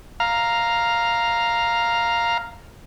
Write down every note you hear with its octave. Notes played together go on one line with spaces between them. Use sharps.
F5 A#5